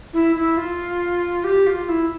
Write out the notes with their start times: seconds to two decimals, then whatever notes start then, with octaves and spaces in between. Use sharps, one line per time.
0.13 E4
0.36 E4
0.57 F4
1.44 G4
1.67 F4
1.89 E4